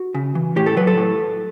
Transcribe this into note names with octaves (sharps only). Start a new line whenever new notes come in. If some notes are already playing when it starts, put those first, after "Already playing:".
Already playing: F#4
C#3
E3
A2 G4
A4
F#3 B4
A4
A2